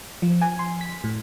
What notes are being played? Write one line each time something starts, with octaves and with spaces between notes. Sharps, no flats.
F3
G#5
C6
B6
A2